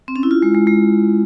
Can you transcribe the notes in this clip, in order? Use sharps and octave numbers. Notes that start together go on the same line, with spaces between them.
C4
C#4
E4
F4
G#3
G#3
G#3